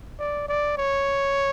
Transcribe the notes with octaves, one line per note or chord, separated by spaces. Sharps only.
D5
D5
C#5